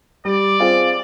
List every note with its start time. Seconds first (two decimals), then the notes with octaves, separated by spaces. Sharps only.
0.25 G3 D5
0.60 C4 F4 G#4